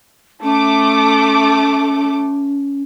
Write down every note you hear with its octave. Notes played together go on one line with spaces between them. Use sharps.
A3 C#4 D6